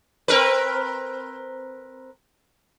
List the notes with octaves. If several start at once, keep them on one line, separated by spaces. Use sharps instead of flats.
C4 A#4 B4